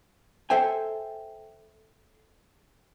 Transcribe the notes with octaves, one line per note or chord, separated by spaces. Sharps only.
A4 C5 E5 G5 G#5